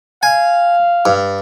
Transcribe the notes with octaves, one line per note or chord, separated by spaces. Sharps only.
F5 G#5
G2